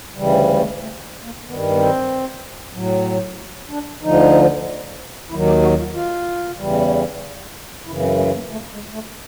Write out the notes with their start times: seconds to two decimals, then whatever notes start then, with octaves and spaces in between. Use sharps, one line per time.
0.16 D2 C#3 E3 G3
0.49 G#3
0.56 A3
0.64 G#3
0.81 A3
1.24 A#3
1.45 G2 D#3 G3 B3
1.69 B3
1.77 C4
2.73 A2 F#3
3.69 D4
4.02 D2 D3 F3 D#4
5.30 D#2 D#3 F#3 E4
5.46 G4
5.63 F#4
5.78 F4
5.94 F4
6.58 E2 C#3 E3 G3
7.86 F#2 C#3 E3 E4
7.98 B3
8.03 C4
8.18 A3
8.34 A#3
8.51 A3
8.73 G#3
8.93 A3